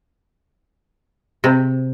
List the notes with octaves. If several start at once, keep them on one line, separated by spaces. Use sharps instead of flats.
C3